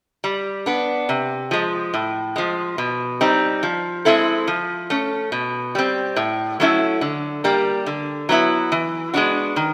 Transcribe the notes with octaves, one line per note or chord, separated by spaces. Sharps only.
G3
B3 D4
C3
F3 G#3
A2
F3 G#3
B2
G3 C4 D#4
F3
G#3 C4 E4 A4
F3
A3 C#4
B2
G3 C4
A2
F#3 A3 C#4 E4
D3
G3 A#3
D3
F#3 B3 E4
E3
G#3 B3 D4 F#4
D#3